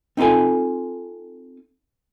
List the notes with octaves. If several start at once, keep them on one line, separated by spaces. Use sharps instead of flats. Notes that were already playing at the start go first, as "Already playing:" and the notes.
C4 D#4 F4 A4 G#5